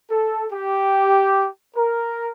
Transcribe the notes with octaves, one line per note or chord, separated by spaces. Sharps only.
A4
G4
A#4